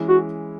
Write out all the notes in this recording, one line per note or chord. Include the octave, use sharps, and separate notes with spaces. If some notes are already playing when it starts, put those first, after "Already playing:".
Already playing: E3 G#3 C#4 E4
F#4